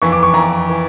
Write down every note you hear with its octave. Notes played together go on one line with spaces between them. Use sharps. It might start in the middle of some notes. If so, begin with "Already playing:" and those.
F2 E3 C#6
D6
C#6
F2 E3 A#5
E3